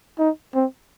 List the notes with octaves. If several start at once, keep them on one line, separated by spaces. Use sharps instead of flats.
D#4
C4